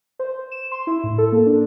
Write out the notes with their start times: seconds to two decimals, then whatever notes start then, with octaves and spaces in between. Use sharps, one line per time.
0.19 C5
0.51 E7
0.72 C6
0.87 E4
1.04 A2
1.18 A4
1.32 A#3
1.46 D4